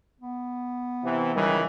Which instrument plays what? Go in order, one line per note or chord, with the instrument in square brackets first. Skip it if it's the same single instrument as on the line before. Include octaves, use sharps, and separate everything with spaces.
[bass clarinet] B3
[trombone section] C3 E3
[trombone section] C#2 D#3 E3 [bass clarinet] G3